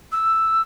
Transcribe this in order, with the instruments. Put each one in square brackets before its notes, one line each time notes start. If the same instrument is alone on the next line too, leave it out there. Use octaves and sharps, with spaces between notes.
[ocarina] E6